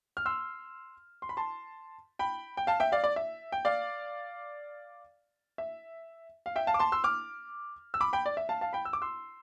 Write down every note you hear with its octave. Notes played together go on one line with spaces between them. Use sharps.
F6
C6 E6
C6
B5
A5 C6
G5 B5
G5
F5 A5
E5 G5
D5 F5
D5
E5
G5
D5 F5
E5
F5
E5 G5
F5 A5
D6
A5 C6
C6 E6
D6 F6
E6
B5 D6
G5 B5
D5
E5
F5 A5
F5 A5
G5 B5
E6
D6
C6 E6